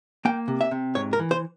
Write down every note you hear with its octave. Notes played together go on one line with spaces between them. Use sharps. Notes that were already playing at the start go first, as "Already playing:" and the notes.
A#3 G5
C3
E5
C3
G#2 C#5
A#4
E3
C5